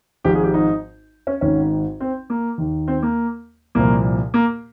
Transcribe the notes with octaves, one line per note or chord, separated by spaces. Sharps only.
G#1 G#2 F3 G4
G#4
G4
D#4
C#4
G#1 G#2 D#3 C#4
C4
A#3
D#2 D#3
C4
A#3
C2 A#2 F3 A#3
A#3